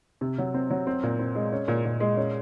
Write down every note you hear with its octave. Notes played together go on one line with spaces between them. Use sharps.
C3
F#3
C4
F#3
C4
A#2
C4
G#3
C#4
A#2
A#2
G#3
C#4